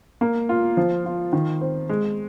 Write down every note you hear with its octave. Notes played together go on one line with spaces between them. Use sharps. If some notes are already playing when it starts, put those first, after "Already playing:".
A#3
F4
F3
F4
D#3
C4
G#3